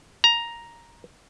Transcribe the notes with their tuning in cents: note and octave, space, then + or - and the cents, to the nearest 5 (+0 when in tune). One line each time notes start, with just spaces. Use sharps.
A#5 +5